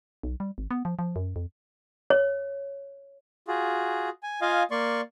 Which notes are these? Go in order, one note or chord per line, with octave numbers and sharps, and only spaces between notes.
B1
G3
G#1
B3
F3
F3
F#2
F2
C#5
F4 F#4 G#4
G#5
F4 D#5 F5 G#5
A#3 D5 C6 C#6